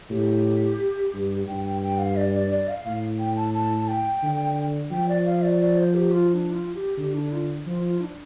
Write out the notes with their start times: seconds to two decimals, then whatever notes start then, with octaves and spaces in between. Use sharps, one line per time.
0.10 A2 G4
1.13 G2
1.47 G2 G5
1.64 G5
1.82 G5
1.99 F5
2.16 D5
2.34 D5
2.51 D5
2.68 F5
2.85 A2 F5
3.19 G5
3.36 A5
3.54 A5
3.88 G5
4.23 D3
4.91 F3 G5
5.09 D5
5.26 F5
5.43 D5
5.61 D5
5.77 C5
5.95 G4
6.12 F4
6.30 F4
6.33 D4
6.52 F4
6.75 G4
6.98 D3 G4
7.14 D4
7.32 F4
7.66 F3 F4
7.84 F4
8.01 D4